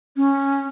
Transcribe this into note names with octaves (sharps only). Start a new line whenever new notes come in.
C#4